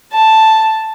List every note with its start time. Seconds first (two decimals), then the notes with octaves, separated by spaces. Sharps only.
0.13 A5